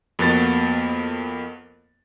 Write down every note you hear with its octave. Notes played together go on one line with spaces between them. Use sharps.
F2 A#3 B3 F#4 A6